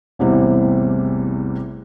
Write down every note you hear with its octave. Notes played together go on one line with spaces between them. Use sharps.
A1 E2 C3 E3 G3